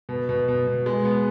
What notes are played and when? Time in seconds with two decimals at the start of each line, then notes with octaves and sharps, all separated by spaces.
0.09 B2
0.29 B2
0.48 B2
0.67 B2
0.86 G#3
1.05 B3